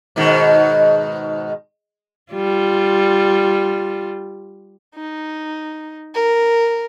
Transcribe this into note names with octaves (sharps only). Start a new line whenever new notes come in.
G#2 B2 D#3
G3 F4
D#4
A#4